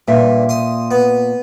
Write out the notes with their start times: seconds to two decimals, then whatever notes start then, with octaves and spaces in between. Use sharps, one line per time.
0.08 G2 A#2 E5
0.49 C6 D#6
0.91 B3